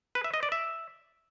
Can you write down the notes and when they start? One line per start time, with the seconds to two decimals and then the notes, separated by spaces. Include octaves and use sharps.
0.15 B4
0.24 E5
0.34 D#5
0.43 D5
0.52 E5